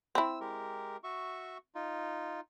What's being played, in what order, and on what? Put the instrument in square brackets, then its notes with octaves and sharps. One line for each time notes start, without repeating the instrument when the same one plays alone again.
[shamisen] C4 E4 [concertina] E6
[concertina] G#3 G4 A#4
F#4 E5 C#6
D#4 F4